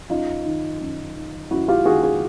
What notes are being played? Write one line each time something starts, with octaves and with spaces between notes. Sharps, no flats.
F#2 D#4 F4
D#3
F#2
D#3
F#2 E4 F#4
F4 G4
D#3 F#4 G#4
F#4 G#4